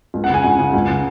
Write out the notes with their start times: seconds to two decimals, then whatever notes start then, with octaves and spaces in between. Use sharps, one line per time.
0.14 C#2
0.24 F#5
0.29 C#3 G#5
0.43 C#2 F#5
0.59 C#3
0.73 C#2
0.89 C#3